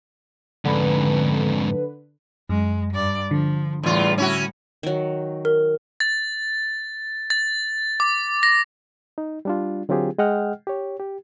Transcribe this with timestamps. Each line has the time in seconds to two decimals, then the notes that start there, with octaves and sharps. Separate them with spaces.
0.65 F2 G#2 D3 B4
2.50 F#2 G#3
2.94 G2 D5
3.31 D3 F3
3.83 E2 A2 G3 F4
4.18 C#4 E4 F#4
4.83 D#3 F#3
5.45 A#4
6.00 A6
7.30 A6
8.00 D6
8.43 A#6
9.18 D#4
9.45 G3 D4 F4
9.89 D3 F#3 C4 F4 G4 G#4
10.18 G#3 G#4 D#5 F#5 G5 F6
10.67 G4 C#5
11.00 G4